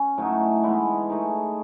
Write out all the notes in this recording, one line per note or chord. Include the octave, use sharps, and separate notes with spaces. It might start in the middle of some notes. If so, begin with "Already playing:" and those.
Already playing: C#4
A2 F#3 A3 D#4
E3 G#3 B3 E4
A3 D#4 G#4